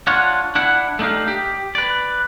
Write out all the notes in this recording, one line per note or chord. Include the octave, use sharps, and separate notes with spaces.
D4 F4 C#5 F#5
D4 E4 F#5
A3 D4 D#4 G4 F5
G4
B4 D5